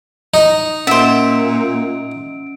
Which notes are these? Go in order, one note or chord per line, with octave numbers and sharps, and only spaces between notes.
D#4
A#2 C#4 C5 E5 D7